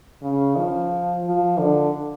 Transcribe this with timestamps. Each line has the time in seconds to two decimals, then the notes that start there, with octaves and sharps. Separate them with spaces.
0.23 C#3
0.57 F3
1.24 F3
1.58 D3